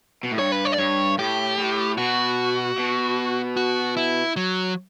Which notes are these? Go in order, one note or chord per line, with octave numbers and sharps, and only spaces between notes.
B2
A2
G2 C#5
B4
C#5
D5
G2 C#5
A2 G4
A2
B2 F#4
B2
F#4
E4
F#3